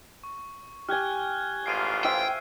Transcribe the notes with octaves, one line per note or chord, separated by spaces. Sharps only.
C#6
G4 G#5 F6 F#6 G#6
A1 G#2 F4 C7 D7 D#7
C5 E5 F5 G5